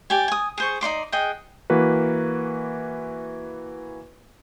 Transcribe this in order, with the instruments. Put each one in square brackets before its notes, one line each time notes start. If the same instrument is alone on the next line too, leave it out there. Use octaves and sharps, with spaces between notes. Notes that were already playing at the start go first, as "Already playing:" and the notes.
[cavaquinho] G4 D5 G#5
G#5 D#6
G#4 C5 C#6
D#4 D5 C6 D6
G#4 D#5 F#5 G5
[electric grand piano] E3 A#3 F#4 B4